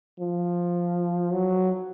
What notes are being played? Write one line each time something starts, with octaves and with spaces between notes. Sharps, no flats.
F3
F#3